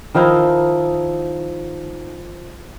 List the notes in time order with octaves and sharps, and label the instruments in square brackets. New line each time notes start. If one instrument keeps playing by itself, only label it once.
[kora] D#3 F3 D#4 E4